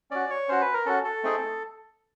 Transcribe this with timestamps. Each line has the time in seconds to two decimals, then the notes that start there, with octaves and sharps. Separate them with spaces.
0.11 C#4 F#4 D5
0.30 C#5
0.49 C#4 F#4 C5
0.61 B4
0.74 A#4
0.86 C#4 F#4 A4
1.04 A4
1.23 A3 C4 D#4 G#4